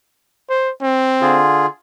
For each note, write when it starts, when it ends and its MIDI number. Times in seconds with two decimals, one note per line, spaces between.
0.49 0.70 72
0.82 1.42 60
1.21 1.66 50
1.21 1.66 65
1.21 1.66 68